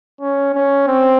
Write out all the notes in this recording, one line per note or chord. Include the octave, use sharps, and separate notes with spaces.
C#4
C#4
C4